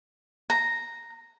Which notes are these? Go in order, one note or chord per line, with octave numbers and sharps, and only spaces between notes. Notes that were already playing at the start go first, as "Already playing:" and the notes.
A#5